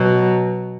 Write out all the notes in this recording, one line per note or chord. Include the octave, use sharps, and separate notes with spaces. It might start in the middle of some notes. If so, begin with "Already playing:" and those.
Already playing: B2 F#3